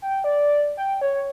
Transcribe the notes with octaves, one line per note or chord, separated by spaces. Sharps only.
G5
D5
G5
C#5